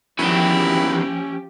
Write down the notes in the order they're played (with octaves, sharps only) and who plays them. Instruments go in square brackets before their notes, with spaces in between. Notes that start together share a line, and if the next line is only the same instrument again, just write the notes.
[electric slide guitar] E2 D#3 F#3 [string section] F3 G4 [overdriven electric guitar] C#4 G5 [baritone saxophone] E4